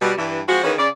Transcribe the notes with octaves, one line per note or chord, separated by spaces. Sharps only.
B2 G3
G2 E3
F3 G#3 C4 F#4
D#3 E3 A#3 C#4 G#4 B4
C#3 D5